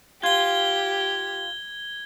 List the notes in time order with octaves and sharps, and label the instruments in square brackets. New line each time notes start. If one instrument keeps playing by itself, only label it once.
[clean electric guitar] F4 [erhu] G4 [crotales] G#6 G7